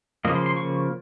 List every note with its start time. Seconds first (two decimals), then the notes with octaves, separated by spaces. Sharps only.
0.25 C#3 F3 A#3 D#5
0.35 C6
0.46 C6
0.57 C#6